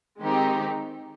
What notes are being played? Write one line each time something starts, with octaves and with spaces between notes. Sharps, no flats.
D#3 G#3 C4 D#4 G4